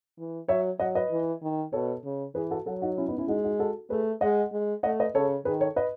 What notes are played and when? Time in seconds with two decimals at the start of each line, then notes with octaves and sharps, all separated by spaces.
0.18 E3
0.48 F#3 C#5 E5
0.80 F#3 D#5 F#5
0.95 B4 D#5
1.11 E3
1.42 D#3
1.73 B2 A4 C#5
2.04 C#3
2.35 E3 G#4 B4
2.51 F#4 A4
2.66 F#3 F#4 A4
2.82 D#4 F#4
2.98 C#4 E4
3.08 B3 D#4
3.18 C#4 E4
3.28 G#3 D#4 F#4
3.44 D#4 F#4
3.59 F#4 A4
3.90 A3 G#4 B4
4.21 G#3 D#5 F#5
4.52 G#3
4.83 A3 D#5 F#5
5.00 B4 D#5
5.15 C#3 A4 C#5
5.45 D#3 G#4 B4
5.61 A4 C#5
5.76 B4 D#5